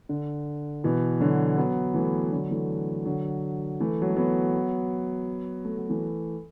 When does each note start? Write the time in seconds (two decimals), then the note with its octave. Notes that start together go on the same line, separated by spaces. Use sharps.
0.09 D3
0.84 B2 E3
1.20 D3 F#3
1.58 F#3 B3
1.94 E3 A3
2.32 D3 F#3
2.51 E3 A3
3.05 D3 F#3
3.80 E3 A3
4.02 F#3
4.09 A3
4.16 F#3 B3
5.65 A3
5.78 F#3
5.89 E3 A3